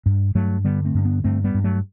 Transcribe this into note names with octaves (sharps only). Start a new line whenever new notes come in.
G2
G2 F#3 A3
D3 G3 B3
A3 C4
G2
B3 D4
G2 A3 C4
G3 B3
G2
F#3 A3